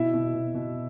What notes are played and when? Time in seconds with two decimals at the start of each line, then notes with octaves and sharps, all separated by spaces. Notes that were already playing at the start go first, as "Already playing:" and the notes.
Already playing: B2 E4 E5
0.14 B2
0.34 B2
0.55 B2